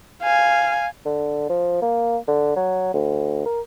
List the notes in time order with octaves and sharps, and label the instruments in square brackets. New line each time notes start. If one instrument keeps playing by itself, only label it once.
[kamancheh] F5 G#5
[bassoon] D3
F3
A#3
D3
F#3
D2
A#4